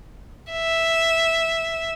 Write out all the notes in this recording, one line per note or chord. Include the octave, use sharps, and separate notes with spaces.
E5